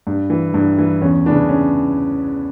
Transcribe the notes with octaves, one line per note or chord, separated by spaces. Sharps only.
G2
E3
G2
E3
E2 C#4
C#3 E3 D4
C#4